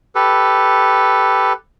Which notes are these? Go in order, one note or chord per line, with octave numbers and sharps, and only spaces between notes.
G4 A4 B4